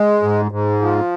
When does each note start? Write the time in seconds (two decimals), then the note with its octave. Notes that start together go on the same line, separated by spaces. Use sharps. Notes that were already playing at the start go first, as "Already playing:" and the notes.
Already playing: G#3
0.22 G#2
0.51 G#2
0.81 F3